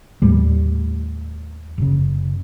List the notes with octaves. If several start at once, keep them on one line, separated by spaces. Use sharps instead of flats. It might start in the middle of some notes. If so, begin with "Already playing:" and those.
D#2 A2 G3 A3
F#1 C#3